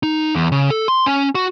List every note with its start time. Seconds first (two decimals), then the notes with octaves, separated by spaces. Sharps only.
0.03 D#4
0.35 E2
0.52 C#3
0.70 A4
0.88 C6
1.06 C#4
1.35 F#4